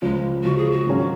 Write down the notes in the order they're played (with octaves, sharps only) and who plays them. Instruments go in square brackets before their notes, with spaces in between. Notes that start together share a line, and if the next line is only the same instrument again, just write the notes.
[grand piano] C#2 C#3 F3 [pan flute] G#3
[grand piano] C#2 C#3 F3 [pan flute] F#4
[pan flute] G#4
F#4
[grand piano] G#2 D#3 F#3 C#4 F4